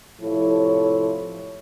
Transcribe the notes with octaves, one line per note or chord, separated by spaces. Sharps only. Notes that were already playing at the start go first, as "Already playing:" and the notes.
A2 C3 F3 E4 A4 C#5